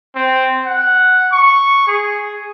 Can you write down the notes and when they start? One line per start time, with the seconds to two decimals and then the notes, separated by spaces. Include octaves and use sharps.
0.15 C4
0.66 F#5
1.32 C#6
1.87 G#4